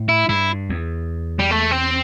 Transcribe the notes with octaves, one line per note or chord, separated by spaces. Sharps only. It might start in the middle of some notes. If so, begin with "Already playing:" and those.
Already playing: A2
E4
G2 E4
E2
G3
A3
C4